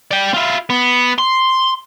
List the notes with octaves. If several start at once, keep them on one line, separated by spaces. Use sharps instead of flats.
D5 G5
E4 F4
B3
C6